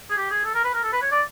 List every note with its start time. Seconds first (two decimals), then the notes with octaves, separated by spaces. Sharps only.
0.10 G#4
0.17 G4
0.31 G#4
0.45 A4
0.55 A#4
0.64 B4
0.74 A#4
0.83 A4
0.92 B4
1.02 C#5
1.11 D5